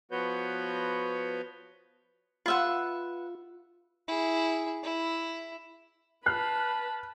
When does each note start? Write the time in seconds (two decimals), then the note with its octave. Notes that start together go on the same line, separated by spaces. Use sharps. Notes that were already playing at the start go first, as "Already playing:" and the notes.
0.11 F3 B3 F#4 B4 C#5 G6
2.46 F4 B4 E5 F#5
4.08 E4 G#4
4.83 E4
6.26 B4 A5 B5 F6 F#6 C7